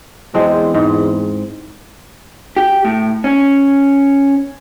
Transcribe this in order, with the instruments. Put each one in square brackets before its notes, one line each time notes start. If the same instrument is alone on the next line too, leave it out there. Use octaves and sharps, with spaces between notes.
[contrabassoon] E2 [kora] G#3 C4 D4
[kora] G#2
[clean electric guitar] G4
A2
C#4